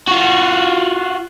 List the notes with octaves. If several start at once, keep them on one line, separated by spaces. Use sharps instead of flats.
F4 F#4